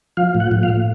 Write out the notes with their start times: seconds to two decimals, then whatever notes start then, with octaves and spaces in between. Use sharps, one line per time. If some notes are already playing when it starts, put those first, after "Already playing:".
0.17 F3 F5
0.35 A2
0.40 F#5
0.51 A2
0.63 F5
0.68 A2